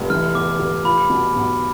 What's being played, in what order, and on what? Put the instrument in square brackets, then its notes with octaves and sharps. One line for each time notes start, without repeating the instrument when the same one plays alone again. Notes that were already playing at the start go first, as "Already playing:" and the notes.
Already playing: [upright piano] F1
[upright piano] E3 [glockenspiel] F6
[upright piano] E2 [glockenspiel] D6
[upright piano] F1
[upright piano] F4 [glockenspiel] B5
[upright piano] B2
B1